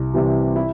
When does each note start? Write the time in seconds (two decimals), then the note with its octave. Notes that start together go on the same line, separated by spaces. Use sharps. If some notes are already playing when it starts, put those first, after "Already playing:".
Already playing: C2
0.14 C3 E3 G3
0.56 E4